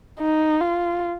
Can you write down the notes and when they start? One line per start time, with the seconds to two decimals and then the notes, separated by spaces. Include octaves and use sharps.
0.20 D#4
0.61 F4